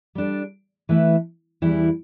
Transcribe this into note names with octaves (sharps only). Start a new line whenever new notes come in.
G3 D4 A4
E3 A3 E4 B4 E5
E2 E3 G3 E4